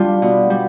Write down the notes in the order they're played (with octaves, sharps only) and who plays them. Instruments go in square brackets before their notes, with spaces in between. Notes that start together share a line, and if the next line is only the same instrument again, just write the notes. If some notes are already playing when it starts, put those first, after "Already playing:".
Already playing: [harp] G3 D4 F4
B2
G3